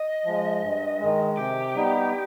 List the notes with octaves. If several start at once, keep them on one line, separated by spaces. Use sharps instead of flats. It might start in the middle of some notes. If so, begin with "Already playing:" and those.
Already playing: D#5
F3 G#3
G2
D#3 G#3
C3 G4
G3 B3 D#4